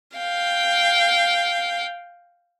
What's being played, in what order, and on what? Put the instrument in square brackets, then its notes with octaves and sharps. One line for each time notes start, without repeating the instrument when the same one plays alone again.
[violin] F5 G5